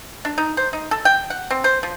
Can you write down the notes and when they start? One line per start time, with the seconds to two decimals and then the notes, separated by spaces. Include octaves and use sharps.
0.25 D4
0.38 D#4
0.57 C5
0.73 D#4
0.91 A4
1.05 G5
1.30 F#5
1.51 C4
1.64 C5
1.83 F3